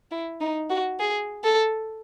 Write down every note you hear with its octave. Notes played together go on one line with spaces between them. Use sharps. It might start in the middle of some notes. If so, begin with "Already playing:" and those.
E4
D#4
F#4
G#4
A4